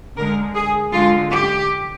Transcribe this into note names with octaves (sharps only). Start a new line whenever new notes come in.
D3 G#3 A#4
G#4
D3 G#3 F4
G4